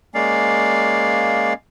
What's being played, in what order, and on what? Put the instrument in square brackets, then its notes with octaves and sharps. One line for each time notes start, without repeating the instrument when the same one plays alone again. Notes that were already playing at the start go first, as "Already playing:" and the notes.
[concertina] G#3 A#3 C#4 D5 F5